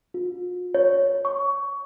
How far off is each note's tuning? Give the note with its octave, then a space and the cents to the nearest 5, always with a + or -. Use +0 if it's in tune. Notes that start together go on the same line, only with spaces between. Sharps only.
F4 +45
C#5 +0
C#6 +20